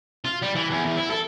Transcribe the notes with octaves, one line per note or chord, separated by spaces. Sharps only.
F4
G3
E3
E2
E2
E4
A4